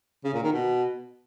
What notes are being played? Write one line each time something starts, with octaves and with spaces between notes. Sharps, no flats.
C#3
A#2
D#3
B2